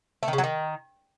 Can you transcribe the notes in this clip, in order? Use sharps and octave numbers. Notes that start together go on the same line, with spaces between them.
A3
D#3
C#3
F#3
D#3